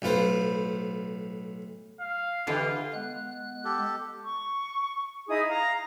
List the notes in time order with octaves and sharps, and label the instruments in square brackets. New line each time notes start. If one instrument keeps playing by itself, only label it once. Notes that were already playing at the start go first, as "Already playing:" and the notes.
[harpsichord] B1 A2 F4 B4 C5
[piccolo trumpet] F5
[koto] D3 E3 [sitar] D4 G4 B4 [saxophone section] F4
[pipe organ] G#3 B3 F#6
[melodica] G4 A4
[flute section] C#6
D#4 E4 G#4 D#6
F5 A#5